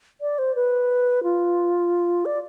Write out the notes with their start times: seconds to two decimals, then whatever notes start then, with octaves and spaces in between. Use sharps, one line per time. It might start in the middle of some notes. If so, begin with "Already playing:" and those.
0.21 D5
0.39 C5
0.55 B4
1.23 F4
2.25 D5